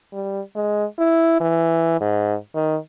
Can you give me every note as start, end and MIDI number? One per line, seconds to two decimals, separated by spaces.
0.12 0.40 55
0.56 0.84 56
0.99 1.38 64
1.40 1.97 52
2.00 2.34 44
2.55 2.76 51